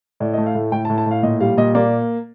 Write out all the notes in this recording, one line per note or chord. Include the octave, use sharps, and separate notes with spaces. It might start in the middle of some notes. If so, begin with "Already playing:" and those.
A2 D5
D#5
A3
F5
A2
A2 G5
A5
A2
A5
A2
F5
A#2 D#5
G3 F5
A#2 D#5
A#3 D5